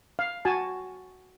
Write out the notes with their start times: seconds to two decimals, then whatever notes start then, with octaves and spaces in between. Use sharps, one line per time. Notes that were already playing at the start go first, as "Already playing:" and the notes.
0.19 F5
0.45 F#4 G#5 A5